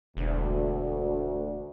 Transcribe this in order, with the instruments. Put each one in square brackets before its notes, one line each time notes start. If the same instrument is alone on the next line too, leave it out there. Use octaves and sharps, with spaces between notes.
[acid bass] E1 [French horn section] D2